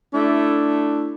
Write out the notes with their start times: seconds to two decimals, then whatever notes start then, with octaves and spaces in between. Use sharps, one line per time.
0.14 A3 D4 E4